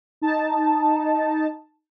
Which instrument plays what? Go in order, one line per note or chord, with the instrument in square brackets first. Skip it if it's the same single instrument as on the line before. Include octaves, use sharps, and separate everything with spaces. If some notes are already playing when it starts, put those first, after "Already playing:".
[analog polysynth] D#4 A5